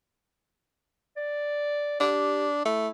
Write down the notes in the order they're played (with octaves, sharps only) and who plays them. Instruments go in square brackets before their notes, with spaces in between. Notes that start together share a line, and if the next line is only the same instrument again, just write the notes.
[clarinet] D5
[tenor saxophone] D4 [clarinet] G4
[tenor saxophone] A3 [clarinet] E4